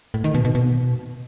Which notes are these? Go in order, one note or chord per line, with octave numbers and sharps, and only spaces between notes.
A2
D#3
B2
B2
B2